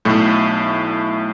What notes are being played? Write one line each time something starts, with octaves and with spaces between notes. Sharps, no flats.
B1 A2 A3